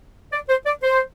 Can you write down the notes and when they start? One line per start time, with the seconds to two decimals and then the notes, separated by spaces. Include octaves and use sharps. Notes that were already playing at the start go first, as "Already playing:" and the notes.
0.33 D5
0.49 C5
0.66 D5
0.83 C5